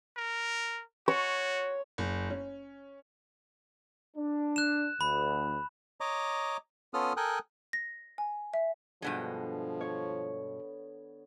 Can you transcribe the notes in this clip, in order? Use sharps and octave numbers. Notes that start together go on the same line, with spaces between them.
A#4
F#4 C#5
F#1
C#4
D4
F#6 E7
D2 B5
C#5 D#5 A#5 D6
B3 C#4 F4 A4 D#6 F6
A4 A#4 G5 G#5 D#6 F#6
A#6
G#5
E5
G2 B2 D3 F3 G#3 B3
C#5